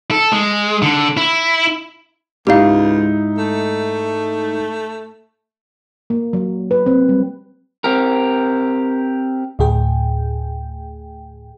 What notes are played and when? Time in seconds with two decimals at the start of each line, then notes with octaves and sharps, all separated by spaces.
0.11 A4
0.32 G#3
0.82 D3
1.17 E4
2.47 C#2 G#2 D#4 E4 G4 F5
3.38 A3
6.10 A#3
6.33 F#3
6.71 B4
6.86 C4
7.09 G3
7.84 C4 G4 A#4
9.59 D2 A2 G#4 G5